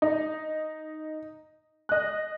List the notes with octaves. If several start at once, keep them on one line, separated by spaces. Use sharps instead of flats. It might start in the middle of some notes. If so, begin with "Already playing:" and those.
D#4
D#5 F#6